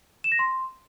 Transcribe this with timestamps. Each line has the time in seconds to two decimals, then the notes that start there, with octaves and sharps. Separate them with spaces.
0.24 E7
0.32 A#6
0.39 C6